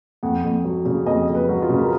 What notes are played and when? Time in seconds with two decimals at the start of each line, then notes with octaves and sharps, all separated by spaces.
0.23 F2 F#5
0.44 F2
0.65 F#3
0.85 C#3
1.06 F2 D#5
1.28 F2
1.35 B4
1.49 F#3
1.62 F4
1.69 C#3
1.79 A#4